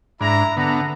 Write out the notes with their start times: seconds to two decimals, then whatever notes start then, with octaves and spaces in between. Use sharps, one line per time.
0.21 G#2 D4 E4 E5 A#5
0.57 D3 B3 A4 F#5 A#5